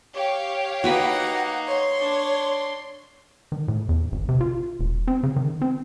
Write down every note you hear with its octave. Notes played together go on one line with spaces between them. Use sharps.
G4 C#5 F5
A#3 D#4 F#4 B4 F#5 B5
C#5 C6
D4
D#3
A2
E2
G#1
C3
F4
E1
C4
C#3
D#3
C4